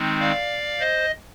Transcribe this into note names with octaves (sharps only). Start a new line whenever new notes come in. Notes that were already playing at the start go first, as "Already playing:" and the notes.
Already playing: D#3 G#3 C4 D#4
D5 F5
C5 D#5